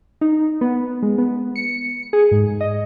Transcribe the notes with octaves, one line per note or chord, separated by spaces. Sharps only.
D#4
B3
G#3
B3
C#7
G#4
G#2
D#5